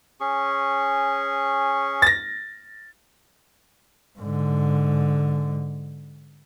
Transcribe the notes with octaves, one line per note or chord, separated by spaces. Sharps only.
C#4 G#4 C#6
A6 A#6
G#2 D3